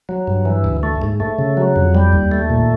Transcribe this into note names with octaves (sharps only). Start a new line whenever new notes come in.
F#3
G2
E3
D2
A3
G#2
A3
C#3
F#3
F2
G3
D#2
A3
A#2